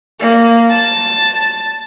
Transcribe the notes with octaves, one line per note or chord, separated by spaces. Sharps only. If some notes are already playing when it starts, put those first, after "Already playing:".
A#3
A5